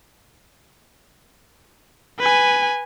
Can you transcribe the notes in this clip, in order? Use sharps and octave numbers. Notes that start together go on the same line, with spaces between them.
B4 G#5